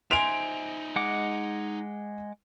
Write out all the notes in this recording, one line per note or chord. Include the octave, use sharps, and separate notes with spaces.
D#4 C5 E5 G#5 C6 D7 F7
G#3 F#5 D6